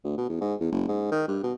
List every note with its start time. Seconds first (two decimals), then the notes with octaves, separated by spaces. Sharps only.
0.04 D2
0.17 B2
0.29 E2
0.41 G#2
0.60 E2
0.72 F#1
0.88 G#2
1.12 D#3
1.28 G2
1.43 B2